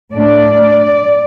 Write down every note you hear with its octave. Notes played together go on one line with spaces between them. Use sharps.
A2 A3 D4 D5